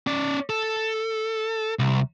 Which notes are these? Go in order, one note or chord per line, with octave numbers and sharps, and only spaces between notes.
C#4 D5
A4
C2